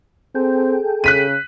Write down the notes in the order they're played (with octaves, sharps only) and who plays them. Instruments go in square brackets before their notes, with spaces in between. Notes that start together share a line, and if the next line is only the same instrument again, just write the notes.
[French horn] C4 [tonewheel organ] G#4 A4 G5
[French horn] C#3 [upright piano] F#6 B6 D#7